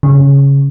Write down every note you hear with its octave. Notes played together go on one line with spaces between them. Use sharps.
C#3